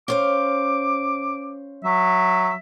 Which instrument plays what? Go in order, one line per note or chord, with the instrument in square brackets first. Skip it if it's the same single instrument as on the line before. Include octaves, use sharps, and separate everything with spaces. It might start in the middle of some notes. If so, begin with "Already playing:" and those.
[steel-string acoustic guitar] C#4 C5 F5 [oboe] D6
[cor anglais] F#3 [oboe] E5